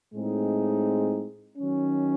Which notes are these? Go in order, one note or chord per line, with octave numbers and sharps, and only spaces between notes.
A2 G#3 C4 D#4 G#4
D#3 F#3 C#4